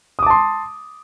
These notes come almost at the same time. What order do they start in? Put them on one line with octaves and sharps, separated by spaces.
D#6 D6 A5 C6